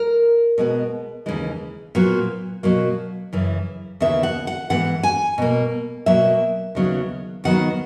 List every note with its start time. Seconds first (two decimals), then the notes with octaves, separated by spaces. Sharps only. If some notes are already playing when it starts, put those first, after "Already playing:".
Already playing: A#4
0.58 B2 G#3 B3
1.26 D#2 C#3 E3 G#3
1.95 A#2 F#3 B3
2.63 B2 F#3 A#3
3.33 F#2 C#3 E3
4.00 D#2 C#3 E3 B3 E5
4.23 F#5
4.47 F#5
4.70 G#2 E3 B3 F#5
5.03 G#5
5.38 B2 A#3
6.06 B2 F#3 A#3 E5
6.75 D#2 C#3 F#3 B3
7.44 D#2 D#3 F#3 B3 F#5